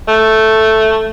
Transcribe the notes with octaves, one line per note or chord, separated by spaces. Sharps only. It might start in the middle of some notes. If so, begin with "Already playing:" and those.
A3